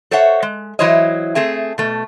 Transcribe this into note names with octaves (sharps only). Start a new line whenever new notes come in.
A4 C5 C#5 E5 F#5
G#3
E3 F#3 E4 C5 C#5 D#5
A3 C4 G#4 E5
B2 A3